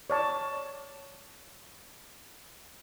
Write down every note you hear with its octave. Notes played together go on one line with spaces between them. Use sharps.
C#5 D5 A5